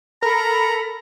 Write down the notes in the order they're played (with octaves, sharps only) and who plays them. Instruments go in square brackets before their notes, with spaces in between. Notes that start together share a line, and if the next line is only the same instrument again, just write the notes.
[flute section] A4 B5 [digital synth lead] A#4 [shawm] A#5